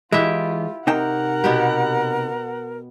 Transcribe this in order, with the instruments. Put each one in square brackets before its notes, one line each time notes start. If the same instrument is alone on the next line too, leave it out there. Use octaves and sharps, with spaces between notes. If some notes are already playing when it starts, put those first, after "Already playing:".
[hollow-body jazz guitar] E3 G#3 [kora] E4 G4 E5 [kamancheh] F4
[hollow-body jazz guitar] C3 D#4 G5 [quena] A#4 [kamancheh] F#5
[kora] B2 B3 G4